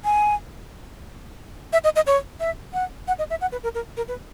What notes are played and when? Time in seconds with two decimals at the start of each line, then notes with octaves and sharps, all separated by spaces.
0.05 G#5
1.73 E5
1.84 D#5
1.96 D#5
2.06 C#5
2.40 E5
2.73 F#5
3.08 F#5
3.19 D#5
3.30 E5
3.41 F#5
3.52 B4
3.63 A#4
3.75 A#4
3.97 A#4
4.08 B4